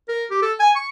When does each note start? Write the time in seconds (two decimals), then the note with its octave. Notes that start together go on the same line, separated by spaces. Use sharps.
0.08 A#4
0.31 G4
0.42 A4
0.60 G#5
0.75 C#6